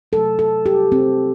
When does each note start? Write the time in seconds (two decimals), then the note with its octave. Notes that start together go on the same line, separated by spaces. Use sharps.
0.12 C3 F#3 A3 A4
0.39 A4
0.66 G4
0.92 C4